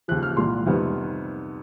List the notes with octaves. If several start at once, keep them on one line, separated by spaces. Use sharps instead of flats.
D#2 C#3 F3 F#6
F6
C2 A#2 G3 A#3 C6
F2 C3 D#3 G3 B3